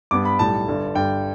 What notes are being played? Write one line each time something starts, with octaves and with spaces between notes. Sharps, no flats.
G2 G3 B3 D6
B5
B1 A2 G3 A5
G1 G2 D3
G2 D3 G3 G5